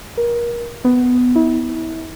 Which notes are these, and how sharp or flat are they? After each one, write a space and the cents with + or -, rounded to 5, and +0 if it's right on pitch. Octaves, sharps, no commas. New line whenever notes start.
A#4 +30
B3 +10
E4 -35